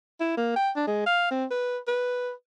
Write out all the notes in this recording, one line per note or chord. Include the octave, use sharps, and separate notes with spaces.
E4
A#3
G5
D4
G#3
F5
C4
B4
B4